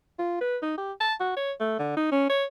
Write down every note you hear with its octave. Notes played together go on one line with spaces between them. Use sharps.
F4
B4
D#4
G4
A5
F#4
C#5
A3
D3
D#4
C#4
C#5